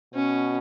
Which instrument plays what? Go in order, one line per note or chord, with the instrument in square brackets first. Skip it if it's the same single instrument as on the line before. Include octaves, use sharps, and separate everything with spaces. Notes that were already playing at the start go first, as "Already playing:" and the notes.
[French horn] B2 [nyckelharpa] C#4